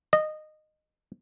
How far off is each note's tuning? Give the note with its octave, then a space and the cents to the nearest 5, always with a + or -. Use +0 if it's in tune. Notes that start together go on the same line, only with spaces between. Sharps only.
D#5 -15